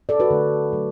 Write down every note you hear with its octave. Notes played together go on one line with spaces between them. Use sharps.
A4 D5
F#4 B4
D3 A3
D3 F#3 A3